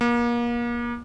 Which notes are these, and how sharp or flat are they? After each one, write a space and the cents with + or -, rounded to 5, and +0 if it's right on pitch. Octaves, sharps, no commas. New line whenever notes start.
A#3 +35